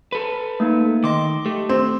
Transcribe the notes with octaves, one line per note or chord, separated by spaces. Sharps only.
A4 B4
A3 A#3 D#4
D#3 D#5 C6 D6
A3 G4
C4